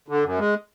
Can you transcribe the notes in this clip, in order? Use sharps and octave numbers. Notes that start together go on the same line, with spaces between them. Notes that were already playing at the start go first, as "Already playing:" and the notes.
D3
F#2
G#3